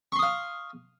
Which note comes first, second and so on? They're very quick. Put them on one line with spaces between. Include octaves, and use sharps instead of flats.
C#6 C6 D#6 F5